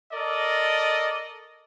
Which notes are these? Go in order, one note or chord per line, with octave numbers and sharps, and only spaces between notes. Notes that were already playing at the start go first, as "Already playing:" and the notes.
A4 A#4 D5 D#5